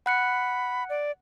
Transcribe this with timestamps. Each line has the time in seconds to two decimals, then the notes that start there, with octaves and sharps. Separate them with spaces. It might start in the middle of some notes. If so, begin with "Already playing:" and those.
0.06 F#5 B5 F#6 C#7
0.89 D5